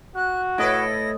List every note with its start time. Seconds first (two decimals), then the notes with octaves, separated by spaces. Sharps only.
0.16 F#4 F#6
0.58 A2 E4 A4 B4 D#5 A#6